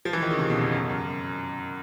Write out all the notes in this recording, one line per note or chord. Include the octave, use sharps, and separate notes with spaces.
F3
E3
D#3
C#3
C3
B2
F2
F#2
F#2